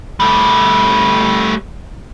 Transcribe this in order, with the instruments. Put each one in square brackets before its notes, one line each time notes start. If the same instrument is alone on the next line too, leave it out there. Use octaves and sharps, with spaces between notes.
[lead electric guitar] G3 A3